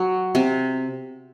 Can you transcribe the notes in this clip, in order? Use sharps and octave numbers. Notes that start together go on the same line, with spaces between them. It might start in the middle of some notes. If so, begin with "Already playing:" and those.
Already playing: F#3
C3